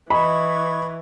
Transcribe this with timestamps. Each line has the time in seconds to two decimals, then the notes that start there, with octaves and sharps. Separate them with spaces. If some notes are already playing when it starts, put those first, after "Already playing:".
0.10 E3 D#5 B5 C#6 G#6